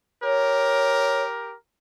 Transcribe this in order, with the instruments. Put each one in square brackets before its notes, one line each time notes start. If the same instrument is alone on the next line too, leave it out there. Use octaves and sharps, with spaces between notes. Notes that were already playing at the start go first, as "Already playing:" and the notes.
[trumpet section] G4 A#4 [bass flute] C#5